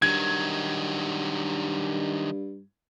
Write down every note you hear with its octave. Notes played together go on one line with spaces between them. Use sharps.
G2 D#3 F#3 G#6